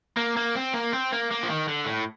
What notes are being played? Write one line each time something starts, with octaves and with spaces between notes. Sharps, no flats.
A#3
A#3
C4
A#3
C4
A#3
A#3
F3
D#3
D3
A2